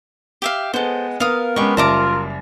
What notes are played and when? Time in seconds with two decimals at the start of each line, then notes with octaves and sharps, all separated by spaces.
0.42 G4 E5 F5
0.74 G#3 B3 A4 B4 C5 F#5
1.20 B3 A#4 F5 D#6
1.56 G#3 B3 C#4 G4 C#6
1.77 F#1 G3 F4 E5 A5 A#5 D6